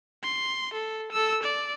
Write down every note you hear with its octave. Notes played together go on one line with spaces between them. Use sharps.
C6
A4
A4 E6
D5